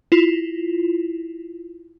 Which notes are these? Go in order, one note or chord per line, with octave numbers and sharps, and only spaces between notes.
E4 F4